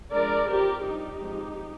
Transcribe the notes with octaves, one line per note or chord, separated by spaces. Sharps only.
F3 G#3 D4 A#4 D5
F3 C4 G4 A#4
G3 D4 D#4 G4
F3 G#3 C4